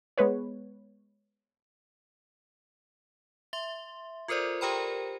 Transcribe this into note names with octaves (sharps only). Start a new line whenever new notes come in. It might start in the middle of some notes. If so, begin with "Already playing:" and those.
G#3 B3 B4 C#5
E5 C6
F4 A4 A#4 C5 D5
G4 A#4 C5 G5 A#5 B5